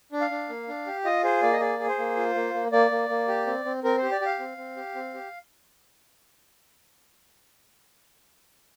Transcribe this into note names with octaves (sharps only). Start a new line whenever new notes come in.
D4
F5
D4
A#3
D4
G4
F4 D#5
G#4 C5
A#3 D5
D#5
G#4 D5
G#4
C5
A#3
F4
A#3
A#3
A#3 D5
A#3
A#3
G4
C4
C4
C4 A#4
G4 C5
D5
G4 F5
C4
C4
G4
C4
G4